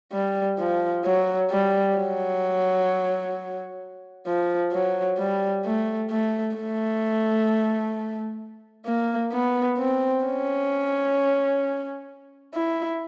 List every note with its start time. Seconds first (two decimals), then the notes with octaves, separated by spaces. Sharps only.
0.12 G3
0.58 F3
1.05 F#3
1.50 G3
1.96 F#3
4.26 F3
4.72 F#3
5.18 G3
5.65 A3
6.10 A3
6.56 A3
8.86 A#3
9.33 B3
9.78 C4
10.25 C#4
12.54 E4